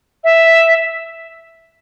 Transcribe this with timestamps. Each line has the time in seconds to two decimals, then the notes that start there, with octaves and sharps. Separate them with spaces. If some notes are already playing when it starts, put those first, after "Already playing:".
0.24 E5